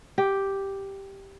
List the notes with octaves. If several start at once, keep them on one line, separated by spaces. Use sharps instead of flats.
G4